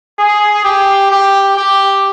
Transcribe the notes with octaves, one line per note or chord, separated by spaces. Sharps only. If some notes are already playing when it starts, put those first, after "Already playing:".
G#4
G4
G4
G4